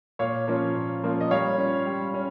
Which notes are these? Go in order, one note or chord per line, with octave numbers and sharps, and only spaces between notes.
A#2 C#5 F5
F3 A#3 C#4 F4
A#2
F3 A#3 C#4 F4
D#5
G3 C#5 F5
C#4 F4
G3
C#4